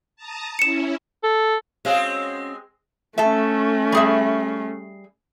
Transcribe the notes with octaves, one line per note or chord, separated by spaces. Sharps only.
A5 A#5 D#6
C#4 E4 C#7 E7
A4
G#3 C4 C#4 F#4 G#4 F5
A3 C#4 A4 E5
G3 G#4 E5